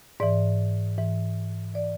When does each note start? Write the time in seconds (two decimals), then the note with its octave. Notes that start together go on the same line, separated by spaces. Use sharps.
0.20 G#2 E3 D5
0.98 G#2 E3
1.74 E3 D5